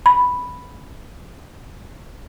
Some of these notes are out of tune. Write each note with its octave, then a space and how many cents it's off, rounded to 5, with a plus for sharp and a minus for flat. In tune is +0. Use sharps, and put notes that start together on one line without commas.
B5 +0